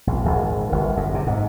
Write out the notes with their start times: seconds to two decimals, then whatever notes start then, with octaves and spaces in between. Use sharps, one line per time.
0.07 A#1
0.25 G#1
0.72 G1
0.97 F#2
1.14 C3
1.27 G#2